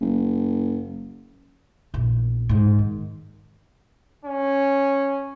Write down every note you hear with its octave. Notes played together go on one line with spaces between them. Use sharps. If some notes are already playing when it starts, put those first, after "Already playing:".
F#1
A#1 E2
G#2
D#3
C#4